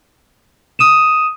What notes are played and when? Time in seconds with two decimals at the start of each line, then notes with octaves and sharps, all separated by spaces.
0.79 D#6 D#7 E7